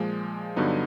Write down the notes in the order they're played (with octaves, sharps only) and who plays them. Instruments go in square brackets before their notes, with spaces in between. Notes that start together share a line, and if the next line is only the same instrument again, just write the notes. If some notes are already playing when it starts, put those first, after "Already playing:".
Already playing: [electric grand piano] A#2 F3 G#3
G2 D3 F#3 B3 D#4